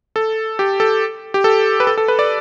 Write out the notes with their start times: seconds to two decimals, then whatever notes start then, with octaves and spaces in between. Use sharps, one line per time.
0.16 A4
0.59 G4
0.80 A4
1.34 G4
1.44 A4
1.80 B4
1.87 A4
1.98 A4
2.08 B4
2.19 D5